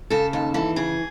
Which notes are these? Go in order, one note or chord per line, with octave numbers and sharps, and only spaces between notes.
C#3 A4
D#2 A4
E3 A4
C#3 G#4